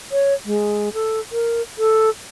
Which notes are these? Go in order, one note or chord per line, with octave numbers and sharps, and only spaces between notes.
C#5
G#3
A4
A#4
A4